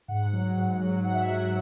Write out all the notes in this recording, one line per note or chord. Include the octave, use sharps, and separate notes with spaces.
G#2 F#5
F#3
G#2
F#3
G#2 F#5
E5
F#5
F#3